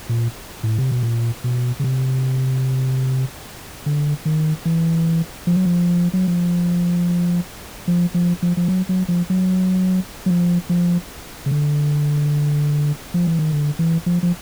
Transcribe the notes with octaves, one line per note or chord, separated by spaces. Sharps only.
A#2
A2
C3
B2
A#2
B2
C#3
C3
D3
D#3
E3
F3
F#3
F3
F#3
F3
F3
F3
F3
F3
F#3
F#3
F3
F#3
F#3
F3
F3
C#3
D3
F3
E3
D#3
D3
E3
F3
F3